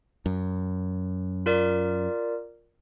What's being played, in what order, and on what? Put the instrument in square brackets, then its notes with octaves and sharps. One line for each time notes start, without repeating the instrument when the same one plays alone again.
[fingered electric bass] F#2
[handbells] F4 A#4 D5